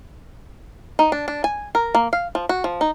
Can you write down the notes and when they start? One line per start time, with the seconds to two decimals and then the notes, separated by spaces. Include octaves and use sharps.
0.99 D#4
1.12 D4
1.28 D4
1.44 G#5
1.75 A#4
1.95 A#3
2.13 F5
2.35 F3
2.49 F#4
2.64 F3
2.81 D#4